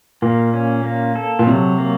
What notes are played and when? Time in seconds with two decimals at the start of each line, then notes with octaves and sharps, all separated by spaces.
0.22 A#2 A#3
0.54 C#4
0.85 A#3
1.15 A4
1.39 A#2
1.47 C3 F#3
1.78 A#3